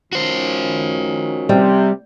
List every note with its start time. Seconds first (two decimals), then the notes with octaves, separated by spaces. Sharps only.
0.13 D#3 F3 C#4 F#4 C5
1.49 C3 G3